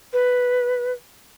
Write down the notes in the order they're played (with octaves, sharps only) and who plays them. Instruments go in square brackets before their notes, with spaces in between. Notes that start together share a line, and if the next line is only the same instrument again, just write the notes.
[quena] B4